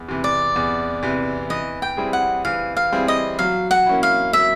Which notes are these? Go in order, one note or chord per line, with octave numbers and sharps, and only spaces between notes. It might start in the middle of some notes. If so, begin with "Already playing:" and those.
Already playing: E2
C3 E3
D5
E2
C3 E3
E3 D#5
G5
G3 C4 E4 G#4
F#5
E3 F5
F5
G3 C4 E4 G#4
D#5
F#3 F5
F#5
A#3 C#4 E4
F5
F#3 E5